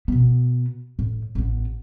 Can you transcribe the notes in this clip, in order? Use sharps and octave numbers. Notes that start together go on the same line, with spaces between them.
B2 B3
A2
A1 B3